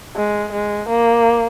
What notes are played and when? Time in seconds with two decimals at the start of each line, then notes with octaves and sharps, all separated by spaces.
0.16 G#3
0.52 G#3
0.89 A#3